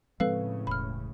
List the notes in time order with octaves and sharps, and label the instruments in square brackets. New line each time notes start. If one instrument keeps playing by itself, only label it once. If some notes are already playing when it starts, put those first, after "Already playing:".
[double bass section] A2 C#3 [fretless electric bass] F3 G#3 C4 [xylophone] A4 B4 F5
[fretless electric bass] E1 [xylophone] B5 F6